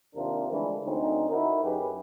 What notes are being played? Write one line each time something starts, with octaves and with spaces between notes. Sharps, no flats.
D#2 C3 D4 F4 A#4
D3 E3 F3 G#3 A3 D4
D2 C4 C#4 D#4
D#4 E4 F#4 A#4
F#2 G4 G#4 B4